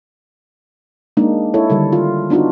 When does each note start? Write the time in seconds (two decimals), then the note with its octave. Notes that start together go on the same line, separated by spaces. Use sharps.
1.17 G#3 A#3 D4 D#4
1.54 E4 A4 C#5
1.70 D3 D#3 G3 A4
1.93 F4
2.30 B3 D4 D#4 F4 F#4